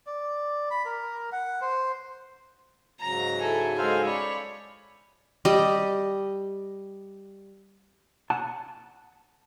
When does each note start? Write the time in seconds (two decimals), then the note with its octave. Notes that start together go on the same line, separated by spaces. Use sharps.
0.07 D5
0.71 B5
0.85 A#4
1.32 F#5
1.61 C5
3.01 G#2 C#3 F#3 A#5
3.41 E4 A4 G#5
3.78 G#3 A4 C5 F5 G#5
4.07 C#5 D5 B5
5.45 G3 G4 D5 D#5
8.30 F#5 A5